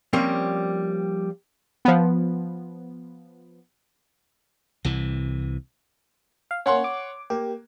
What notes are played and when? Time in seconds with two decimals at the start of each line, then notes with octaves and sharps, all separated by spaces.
0.13 F3 G3 A#3 C4 C#4
1.85 F3 B3
4.85 C2 C3 E3
6.51 F5
6.66 A#3 C#4 C#5 F#5 C6
6.84 D6
7.30 A#3 G4